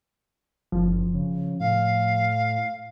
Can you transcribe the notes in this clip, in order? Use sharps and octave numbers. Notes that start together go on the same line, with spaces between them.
F#1 F3
C#3
A2 F5